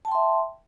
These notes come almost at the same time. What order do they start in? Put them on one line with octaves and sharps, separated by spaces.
A5 G5 C6 E5